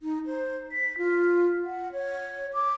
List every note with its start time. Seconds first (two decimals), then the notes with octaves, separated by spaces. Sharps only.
0.01 D#4
0.26 C5
0.72 B6
0.98 F4
1.65 F#5
1.92 C#5
2.54 D6